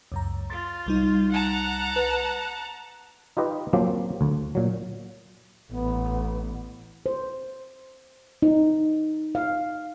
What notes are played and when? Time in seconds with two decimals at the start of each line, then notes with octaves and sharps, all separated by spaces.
0.12 C#2 F#2 A#5
0.50 F4 C6 A6
0.86 C2 G3 D#4
1.31 F#5 A5 A#5
1.96 B4
3.37 D#4 F4 G4 B4 D#5
3.73 F3 F#3 A#3 C4 C#4 G4
4.21 D2
4.55 A#2 F#3
5.71 A1 B3
7.06 C5
8.42 D#4
9.35 F5